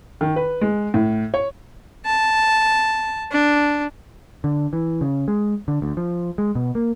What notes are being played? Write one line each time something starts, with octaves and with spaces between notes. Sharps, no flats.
D#3
B4
G#3
A2
C#5
A5
D4
D3
E3
C#3
G#3
D3
D2
F3
G#3
B2
A#3